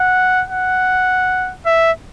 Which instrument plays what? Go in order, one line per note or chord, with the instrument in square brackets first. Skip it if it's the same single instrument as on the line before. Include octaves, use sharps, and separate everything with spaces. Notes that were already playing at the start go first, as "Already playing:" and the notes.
Already playing: [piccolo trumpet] F#5
F#5
E5